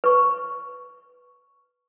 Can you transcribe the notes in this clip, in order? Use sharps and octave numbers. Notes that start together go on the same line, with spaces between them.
B4 C#6